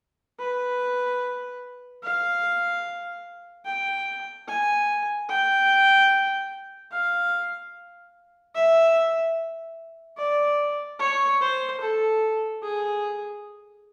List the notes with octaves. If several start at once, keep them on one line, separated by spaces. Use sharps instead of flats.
B4
F5
G5
G#5
G5
F5
E5
D5
C#5
C5
A4
G#4